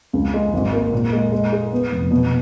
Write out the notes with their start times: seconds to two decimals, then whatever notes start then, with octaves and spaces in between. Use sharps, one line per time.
0.13 C#2
0.34 G#3
0.54 G#1
0.73 A#3
0.92 A#2
1.13 G#3
1.32 G#3
1.53 G#4
1.72 B3
1.92 F1
2.11 B2